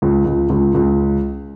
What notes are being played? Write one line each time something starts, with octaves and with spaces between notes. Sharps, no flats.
C#2
C#2
C#2
C#2